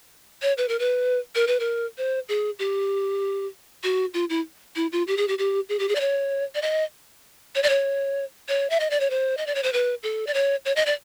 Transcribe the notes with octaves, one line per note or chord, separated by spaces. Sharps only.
C#5
B4
A#4
B4
A#4
B4
A#4
C5
G#4
G4
F#4
F4
E4
E4
F4
G4
G#4
G4
G4
G#4
G4
G#4
D5
C#5
D5
D#5
C#5
D5
C#5
C#5
E5
D#5
D5
C#5
C5
D#5
D5
C#5
C5
B4
A4
D5
C#5
C#5
D#5
D5